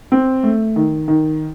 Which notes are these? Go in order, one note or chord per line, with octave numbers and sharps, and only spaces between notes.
C4
A3
D#3
D#3